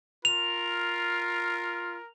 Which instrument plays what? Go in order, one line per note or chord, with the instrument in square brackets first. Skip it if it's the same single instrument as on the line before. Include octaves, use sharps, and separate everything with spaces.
[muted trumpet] F4 [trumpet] A#4 [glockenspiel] F7